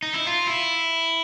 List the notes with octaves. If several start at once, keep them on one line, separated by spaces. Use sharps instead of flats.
D#4
E4
F4
E4